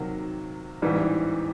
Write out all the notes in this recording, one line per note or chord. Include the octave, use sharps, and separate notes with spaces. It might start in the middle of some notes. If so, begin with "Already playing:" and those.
Already playing: C3 D#3 F#3 A#3
A1 G#2 E3 G3